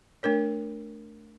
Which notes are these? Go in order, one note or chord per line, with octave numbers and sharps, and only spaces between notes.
A3 D4 A#4 C#5